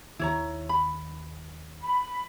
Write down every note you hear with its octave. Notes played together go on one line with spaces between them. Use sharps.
D#2 D#3 E4 C#5 A#5
B5
B5